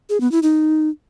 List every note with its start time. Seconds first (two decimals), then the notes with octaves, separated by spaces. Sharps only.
0.09 G#4
0.21 B3
0.32 E4
0.43 D#4